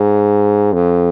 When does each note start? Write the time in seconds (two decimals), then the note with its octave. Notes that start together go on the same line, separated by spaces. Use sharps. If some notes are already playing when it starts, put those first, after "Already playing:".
Already playing: G#2
0.73 F2